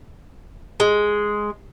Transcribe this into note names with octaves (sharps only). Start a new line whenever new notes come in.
G#3